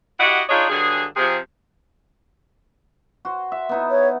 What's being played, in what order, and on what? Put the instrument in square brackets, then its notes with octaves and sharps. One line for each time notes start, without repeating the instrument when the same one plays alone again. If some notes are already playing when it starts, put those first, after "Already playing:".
[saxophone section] E4 F#4 G4 D#5 F#5
D4 D#4 F4 G#4 C#5 D#5
G2 D3 F#3 G#4
C3 F3 G#4
[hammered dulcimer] F#4 C5
E5
B3 D#4 E4
[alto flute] C#5